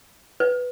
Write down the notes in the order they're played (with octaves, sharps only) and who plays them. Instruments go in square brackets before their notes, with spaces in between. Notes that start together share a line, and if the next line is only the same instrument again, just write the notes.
[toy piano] B4